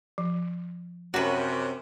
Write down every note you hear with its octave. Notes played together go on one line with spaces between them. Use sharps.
F3
F#2 C3 C#4 F#4 A#4 B4 D#7